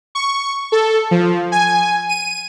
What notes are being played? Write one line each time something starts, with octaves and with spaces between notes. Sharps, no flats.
C#6
A4
F3
G#5
D#7